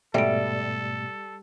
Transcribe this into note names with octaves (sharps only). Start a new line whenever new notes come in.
G#2 B2 G3 A3 A4 E5 D7